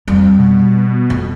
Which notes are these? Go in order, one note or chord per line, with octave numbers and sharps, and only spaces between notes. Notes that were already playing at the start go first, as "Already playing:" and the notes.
F2 G3
B2
F2